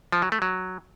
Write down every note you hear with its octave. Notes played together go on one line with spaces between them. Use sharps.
F3
F#3
A3
F#3